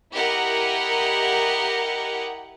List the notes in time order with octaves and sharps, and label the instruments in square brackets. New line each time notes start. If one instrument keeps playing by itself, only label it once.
[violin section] E4 G4 A#4 D#5 F#5